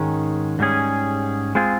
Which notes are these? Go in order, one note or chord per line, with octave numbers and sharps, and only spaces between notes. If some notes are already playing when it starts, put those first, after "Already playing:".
Already playing: G#2 D#3 G#3 C#4
G#2 G3 C#4 G#4
G#3 C4 F4 G#4